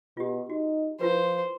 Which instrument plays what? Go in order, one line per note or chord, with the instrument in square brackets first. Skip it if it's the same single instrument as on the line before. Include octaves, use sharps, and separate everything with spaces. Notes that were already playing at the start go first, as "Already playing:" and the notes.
[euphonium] B2 [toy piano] F4 G4
[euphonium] D#4 [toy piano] F#4
[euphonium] F3 [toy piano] E4 F4 B4 [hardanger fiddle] C5